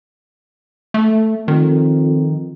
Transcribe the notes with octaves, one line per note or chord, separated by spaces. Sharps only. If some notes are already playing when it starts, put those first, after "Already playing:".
A3
F2 D#3